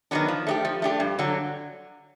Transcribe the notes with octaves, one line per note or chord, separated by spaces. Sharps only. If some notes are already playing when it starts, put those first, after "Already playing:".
D#3 F#3 B3 D4
F3
A3 D4 G4
F3
A3 D4 G4
G2
D3 F#3